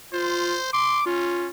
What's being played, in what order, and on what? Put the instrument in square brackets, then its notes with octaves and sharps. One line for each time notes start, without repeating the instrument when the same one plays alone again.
[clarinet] F4 [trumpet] C5
[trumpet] C6 [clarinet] D6
[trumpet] C#4 [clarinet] F4